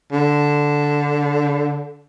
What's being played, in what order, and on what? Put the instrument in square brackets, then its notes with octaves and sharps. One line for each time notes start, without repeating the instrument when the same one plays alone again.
[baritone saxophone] D3